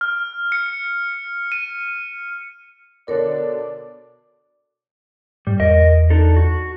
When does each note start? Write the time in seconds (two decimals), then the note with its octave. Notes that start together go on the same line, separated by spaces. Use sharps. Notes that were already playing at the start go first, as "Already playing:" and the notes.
0.01 F6
0.52 C#7
1.52 D#7
3.08 B2 D3 D4 A#4 C#5 D5
5.47 G#2 G3
5.60 E2 A#4 D#5
6.10 D4 D#4 A4
6.36 F#4